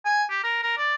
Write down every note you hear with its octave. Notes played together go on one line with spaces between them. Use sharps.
G#5
G4
A#4
A#4
D5